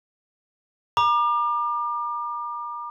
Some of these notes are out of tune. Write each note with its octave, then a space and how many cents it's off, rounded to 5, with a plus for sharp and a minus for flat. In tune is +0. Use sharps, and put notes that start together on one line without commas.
A#5 +35 D6 +35